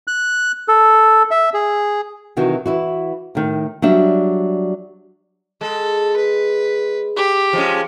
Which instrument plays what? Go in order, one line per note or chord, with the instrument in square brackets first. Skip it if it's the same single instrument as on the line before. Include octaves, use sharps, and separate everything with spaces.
[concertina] F#6
A4
E5
G#4
[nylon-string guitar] C3 D#3 E3 D#4 F#4
E3 E4 F#4
A2 D#3
F#3 G3 D4 E5
[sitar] G#3 [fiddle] A4
[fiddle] B4
G4
[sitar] F3 G#3 C#4